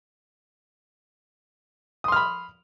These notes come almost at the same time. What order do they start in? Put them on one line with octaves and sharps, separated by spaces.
D#6 C6 F6 B5